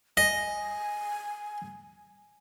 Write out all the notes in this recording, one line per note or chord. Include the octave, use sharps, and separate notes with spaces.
D#5 G#5